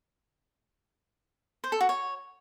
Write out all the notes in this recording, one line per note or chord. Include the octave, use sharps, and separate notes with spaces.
C5
A4
F#4
C#5